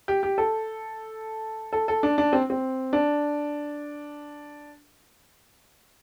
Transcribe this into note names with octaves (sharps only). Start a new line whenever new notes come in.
G4
G4
A4
A4
A4
D4
D4
C4
C4
D4